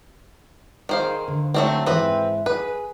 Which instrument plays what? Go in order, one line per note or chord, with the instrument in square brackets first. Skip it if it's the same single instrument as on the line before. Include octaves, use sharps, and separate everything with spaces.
[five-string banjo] D#3 C5 F5 [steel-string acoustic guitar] G#4 A#4
[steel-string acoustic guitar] D3
[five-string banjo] F#3 A3 C4
[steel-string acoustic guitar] G#2 E3 E5 [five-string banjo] C4 B4
[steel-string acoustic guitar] G#4 [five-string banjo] B4